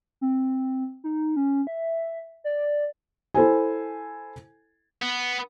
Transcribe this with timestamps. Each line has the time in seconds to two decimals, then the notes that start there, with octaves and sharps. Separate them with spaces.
0.21 C4
1.04 D#4
1.36 C#4
1.67 E5
2.44 D5
3.34 E4 A4 C5 G#5
5.02 B3